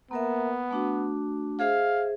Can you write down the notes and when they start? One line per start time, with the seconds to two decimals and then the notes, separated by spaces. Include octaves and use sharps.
0.11 A#3 B3 A#4 E5
0.71 A3 D4 F#4
1.60 G#4 C5 E5 F5